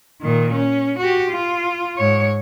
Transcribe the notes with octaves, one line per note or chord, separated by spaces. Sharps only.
A#2 D#3
C#4
F#4 G4
F4
G#2 C#5